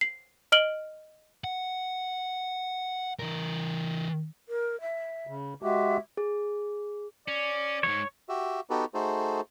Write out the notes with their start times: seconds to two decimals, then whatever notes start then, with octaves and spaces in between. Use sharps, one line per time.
0.01 C7
0.52 D#5 F6 D7 F#7 G7
1.44 F#5
3.19 E3 A#4
4.49 A#4
4.81 E5
5.27 C#3
5.63 G#3 F#4 G4 E5
6.17 G#4
7.28 C#4 D5
7.83 F2 G#2 C#5
8.29 F#4 G4 E5
8.70 B3 D#4 F#4 G4 A4 B4
8.94 A3 D#4 F#4 G#4 A4 C5